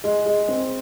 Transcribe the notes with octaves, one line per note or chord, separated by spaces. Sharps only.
G#3
G#3
C4